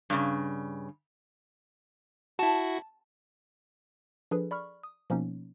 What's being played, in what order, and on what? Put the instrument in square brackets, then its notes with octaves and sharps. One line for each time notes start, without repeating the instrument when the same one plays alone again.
[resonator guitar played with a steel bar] G2 C#3
[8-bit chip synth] E4 F#4 [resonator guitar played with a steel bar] A5
[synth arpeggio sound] F3 D4 G#4 A4 B4
D5 B5 C#6 F6
D#6
B2 F3 A#3 B3 C#4 D#4